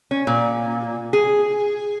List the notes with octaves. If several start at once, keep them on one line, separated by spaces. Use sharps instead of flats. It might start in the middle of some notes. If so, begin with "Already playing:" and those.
C#4
A#2
G#4